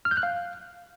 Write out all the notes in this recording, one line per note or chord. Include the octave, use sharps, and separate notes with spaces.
F6
G6
F#6
F5